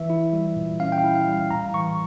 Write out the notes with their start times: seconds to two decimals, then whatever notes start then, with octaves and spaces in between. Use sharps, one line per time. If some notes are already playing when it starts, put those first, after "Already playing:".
Already playing: E3 E5
0.10 E4
0.33 G3
0.56 A#2
0.80 C#4 F5
0.92 G5
0.98 F5
1.03 E4
1.15 F5
1.27 G3
1.33 F5
1.50 A2 A#5
1.74 E3 C#6